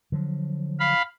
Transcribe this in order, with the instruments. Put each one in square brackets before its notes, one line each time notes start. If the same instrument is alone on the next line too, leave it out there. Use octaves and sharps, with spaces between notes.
[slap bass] D3 F3 F#3
[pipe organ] F5 B5